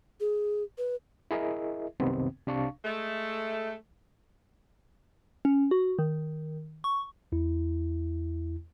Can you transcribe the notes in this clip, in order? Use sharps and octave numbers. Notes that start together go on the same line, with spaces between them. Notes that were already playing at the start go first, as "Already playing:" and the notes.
G#4
B4
E4 G#4 A#4 D#5 E5
C2 F#2 C3 D#3 B3 C4
C2 C3 D4 F5 A5 C#6
G#3 A3
C#4
F#4
D#3
C#6
E2 E4